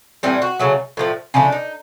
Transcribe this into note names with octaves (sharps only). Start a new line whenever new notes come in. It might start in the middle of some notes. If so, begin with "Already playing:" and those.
A2 E3 G3 C4
F#4
C#3 F#3 A3
A2 F3 A3
C#3 F3 A3 D4
D#4